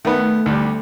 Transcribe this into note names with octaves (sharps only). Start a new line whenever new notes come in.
D#3 A3 B3
D2 G3